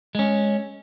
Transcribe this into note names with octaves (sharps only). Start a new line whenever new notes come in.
G#3 C#4